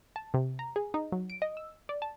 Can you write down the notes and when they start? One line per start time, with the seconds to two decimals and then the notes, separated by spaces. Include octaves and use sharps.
0.16 A5
0.34 C3
0.59 A#5
0.76 G#4
0.94 D#4
1.12 F#3
1.30 D7
1.42 D#5
1.57 E6
1.89 D5
2.02 A5